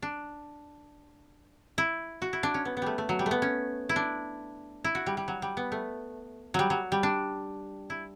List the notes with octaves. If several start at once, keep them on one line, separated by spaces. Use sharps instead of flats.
D4
E4
F#4
E4
D4
C#4
B3
B3
G3 A3
A3
F#3
G3
A3
B3
C#4
E4
D4
E4
F#4
G3
G3
F#3
G3
B3
A3
F#3 G3
F#3
G3
D4
E4